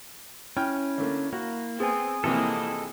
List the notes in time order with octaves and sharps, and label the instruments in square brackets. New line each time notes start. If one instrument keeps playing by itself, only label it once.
[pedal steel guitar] C#4 [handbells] E4 [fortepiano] G5 F6
[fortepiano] D3 A3 A#3
[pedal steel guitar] A#3 [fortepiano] F#4
[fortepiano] B3 [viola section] C4 [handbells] G#4 G#5
[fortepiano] A#1 C3 E3 [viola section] A#3 C4 E4 [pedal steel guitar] A4 D#5